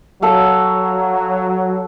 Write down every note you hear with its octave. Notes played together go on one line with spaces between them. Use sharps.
F#3 A4 F5